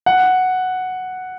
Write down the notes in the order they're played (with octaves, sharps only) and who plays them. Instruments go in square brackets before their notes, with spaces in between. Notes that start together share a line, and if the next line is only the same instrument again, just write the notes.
[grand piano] F#5